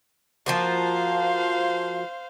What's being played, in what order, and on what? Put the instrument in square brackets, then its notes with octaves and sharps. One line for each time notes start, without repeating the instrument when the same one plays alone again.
[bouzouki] F3 A#3 F#4 [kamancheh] C5 F5